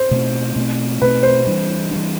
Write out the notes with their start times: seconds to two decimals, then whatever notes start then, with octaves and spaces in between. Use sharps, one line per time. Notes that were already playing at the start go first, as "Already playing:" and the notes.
Already playing: C5
0.11 B2 A3 C4
0.56 B2 A3 C4
1.02 B2 A3 C4 B4
1.23 C5
1.47 E3 G3 D4
1.91 E3 G3 D4